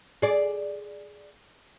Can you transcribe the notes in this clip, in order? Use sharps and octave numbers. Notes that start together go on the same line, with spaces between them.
G#4 D5